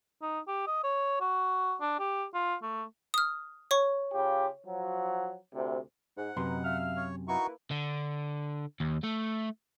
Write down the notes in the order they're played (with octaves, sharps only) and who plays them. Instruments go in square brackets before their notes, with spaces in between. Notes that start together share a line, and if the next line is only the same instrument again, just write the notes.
[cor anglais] D#4
G4
D#5
C#5
F#4
D4
G4
F4
A3
[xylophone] D#6 F6
C#5 C#6
[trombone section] C#3 F4 G4
F3 F#3
D2 C3
[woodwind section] G#2 [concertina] F#5
[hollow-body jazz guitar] F#2 C3 C6 [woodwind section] D#4 A#4 B4
[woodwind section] E5 F5 F6
[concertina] C#5
[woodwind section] A#3 E4 B4 [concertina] D#4 F#4 C#6
[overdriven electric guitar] D3
D#2
A3